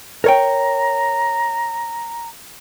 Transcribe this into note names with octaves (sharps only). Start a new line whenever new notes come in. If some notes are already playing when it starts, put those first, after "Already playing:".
A#4 C#5 G5 A#5